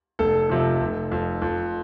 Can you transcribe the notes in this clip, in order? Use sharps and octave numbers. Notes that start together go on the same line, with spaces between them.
F1 A4
F2 C3 F3
F1
F2 F3
F2